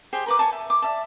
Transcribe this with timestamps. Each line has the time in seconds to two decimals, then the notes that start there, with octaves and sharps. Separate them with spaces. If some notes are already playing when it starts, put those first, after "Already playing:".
0.13 G4 G#4 C5 C6
0.26 A#4 B4 D6
0.39 C#5 G#5 A5
0.52 E5
0.70 D6
0.82 D5 E5 A5